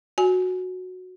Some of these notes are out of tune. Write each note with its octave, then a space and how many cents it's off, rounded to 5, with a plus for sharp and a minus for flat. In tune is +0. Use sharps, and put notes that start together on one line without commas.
F#4 -10 G#5 +10